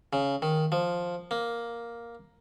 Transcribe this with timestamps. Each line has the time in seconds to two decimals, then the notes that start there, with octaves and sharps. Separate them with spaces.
0.13 C#3
0.42 D#3
0.72 F3
1.31 A#3